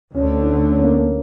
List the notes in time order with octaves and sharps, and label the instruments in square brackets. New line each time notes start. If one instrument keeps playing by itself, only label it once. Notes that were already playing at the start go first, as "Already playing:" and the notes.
[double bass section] D2 D3 A3 [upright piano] C#4
[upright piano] D4
C#4
C#4
A#3
A#3